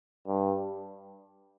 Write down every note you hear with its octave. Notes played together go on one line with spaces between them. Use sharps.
G2